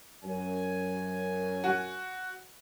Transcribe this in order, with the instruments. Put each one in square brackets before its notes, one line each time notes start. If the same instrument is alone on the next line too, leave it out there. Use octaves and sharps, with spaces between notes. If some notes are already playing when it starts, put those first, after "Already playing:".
[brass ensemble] F#2 G#5
[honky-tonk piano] F#4